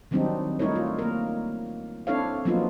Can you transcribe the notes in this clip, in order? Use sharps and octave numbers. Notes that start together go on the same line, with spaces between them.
D#3 F#3 G3 C4 D4 D#4
G3 A3 D#4 E4 A#4 C#5
F4
A#3 A#4
C4 D4 E4 A4 C#5 F5
F3 F#3 A#3 B3 D#4 F4